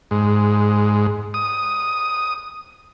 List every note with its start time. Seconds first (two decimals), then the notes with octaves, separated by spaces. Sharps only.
0.11 G#2
1.34 D#6